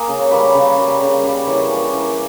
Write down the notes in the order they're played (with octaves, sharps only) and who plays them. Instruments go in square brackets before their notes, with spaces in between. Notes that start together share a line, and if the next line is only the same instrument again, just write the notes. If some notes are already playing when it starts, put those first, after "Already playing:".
Already playing: [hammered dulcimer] A#3 G#4 A#4
C#3
C#5
G3 A#3 B4
C#5
C#3
G3 A#3
C#3
G3 A#3
E3 C#5
A#3 C#4
E3